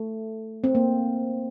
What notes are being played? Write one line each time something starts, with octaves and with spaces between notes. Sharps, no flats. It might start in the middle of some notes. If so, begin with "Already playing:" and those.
Already playing: A3
C4
A#3